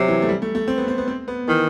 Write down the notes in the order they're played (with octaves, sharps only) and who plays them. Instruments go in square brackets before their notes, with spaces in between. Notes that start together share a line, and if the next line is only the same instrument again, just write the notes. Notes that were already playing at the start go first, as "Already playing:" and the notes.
Already playing: [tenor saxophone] C3 [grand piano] F#3
[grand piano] E3
A3
G3
A3
A3
C4
B3
C4
B3
C4
B3
[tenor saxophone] D#3 [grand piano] E3